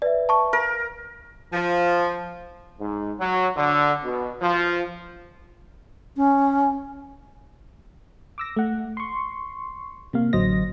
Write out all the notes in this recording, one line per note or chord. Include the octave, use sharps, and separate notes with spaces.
B4 D5 E5
A5 C#6
A#4
F3
G#2
F#3
D3
B2
F3
C#4
D6 E6 A#6
A3 F#5
C6 C#6
C3 A#3 F5
A1 D3 F#3 C5 D#5 A#6